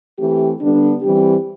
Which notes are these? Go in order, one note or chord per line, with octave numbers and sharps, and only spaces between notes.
E3 A3 C4 G4
D3 G3 B3 D4
E3 G3 C4 G4